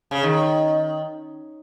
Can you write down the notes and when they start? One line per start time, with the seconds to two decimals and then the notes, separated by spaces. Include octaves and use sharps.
0.11 C#3
0.23 D#3